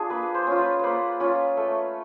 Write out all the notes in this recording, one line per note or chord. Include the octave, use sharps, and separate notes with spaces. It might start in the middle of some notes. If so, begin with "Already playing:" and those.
Already playing: D4 F4 G#4
A#3 B4
C5
C#4 F4
B4
A#3 B4 C5
C#4 F4
A3